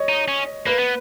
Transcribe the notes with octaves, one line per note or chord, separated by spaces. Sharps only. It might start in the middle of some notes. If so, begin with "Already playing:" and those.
Already playing: C#5 D#5
D#4
C#4
A#3 B4
B3